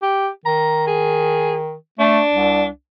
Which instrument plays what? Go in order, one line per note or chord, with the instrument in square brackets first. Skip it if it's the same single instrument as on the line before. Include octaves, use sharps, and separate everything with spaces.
[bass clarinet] G4
[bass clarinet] D#3 [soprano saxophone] A#5
[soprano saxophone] G#4
[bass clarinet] A3 [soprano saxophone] D4
[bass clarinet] C2